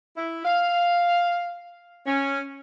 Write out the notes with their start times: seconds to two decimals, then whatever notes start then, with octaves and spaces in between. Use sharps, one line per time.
0.17 E4
0.45 F5
2.07 C#4